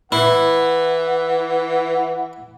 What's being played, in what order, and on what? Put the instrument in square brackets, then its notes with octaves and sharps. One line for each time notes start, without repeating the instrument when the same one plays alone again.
[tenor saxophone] E3 [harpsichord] E4 [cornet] F#5